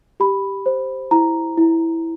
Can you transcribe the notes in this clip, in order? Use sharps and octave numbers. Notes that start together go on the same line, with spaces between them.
G4 B5
C5
E4 A#5
E4